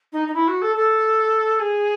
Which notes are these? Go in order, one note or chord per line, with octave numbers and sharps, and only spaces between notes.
D#4
D#4
E4
F#4
A4
A4
G#4